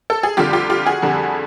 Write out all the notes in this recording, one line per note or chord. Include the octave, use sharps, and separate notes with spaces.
A4
G#4
F2 D3 G3 F4 G4
F4 G4
F4 G4
F#4 G#4
F2 D3 G3